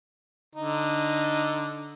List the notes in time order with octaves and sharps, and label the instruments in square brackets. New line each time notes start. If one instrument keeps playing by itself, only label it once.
[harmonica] D3 D#4